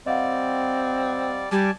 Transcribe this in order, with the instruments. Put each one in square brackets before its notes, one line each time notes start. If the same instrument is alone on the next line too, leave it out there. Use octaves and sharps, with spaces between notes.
[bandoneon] G3 D5 [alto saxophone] C4 [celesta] D#5 F5 F#5
[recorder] G3 [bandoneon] D5 G#5 A5